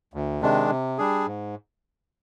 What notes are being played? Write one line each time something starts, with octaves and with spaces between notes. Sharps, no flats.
D2
C3 D#3 G#3 D4
C3
G3 D4 G#4
G#2